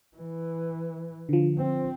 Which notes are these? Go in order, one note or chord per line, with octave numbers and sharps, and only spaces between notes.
E3
D3 F3
C4